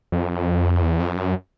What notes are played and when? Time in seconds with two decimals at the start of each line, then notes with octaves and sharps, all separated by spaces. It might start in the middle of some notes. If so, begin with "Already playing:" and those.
0.12 F2
0.82 E2
1.00 F2
1.16 F#2